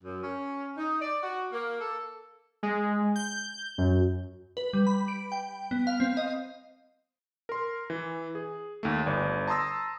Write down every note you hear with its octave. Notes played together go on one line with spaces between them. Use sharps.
F#2
C#4
D#4
D5
F#4
A#3
A4
G#3
G6
F#2
B4
G3
B5
D7
G5
B3
F5
C4
D#5
A#4 C6
E3
G#4
D#2 A3
G1 D5 D#5
A5 A#5 C6 D#6 E6 A#6